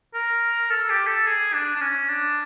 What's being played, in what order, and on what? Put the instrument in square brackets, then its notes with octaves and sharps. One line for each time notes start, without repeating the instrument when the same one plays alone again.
[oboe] A#4
A4
G4
A4
G#4
D4
D4
C#4
D4